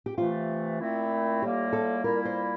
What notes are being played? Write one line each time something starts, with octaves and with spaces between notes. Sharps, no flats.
G4
C3 E3 A3 F4
A#2 A3 C4 E4
A2 G3 A#3 F4 G4
A4
A#2 G3 A#3 E4 A#4
C5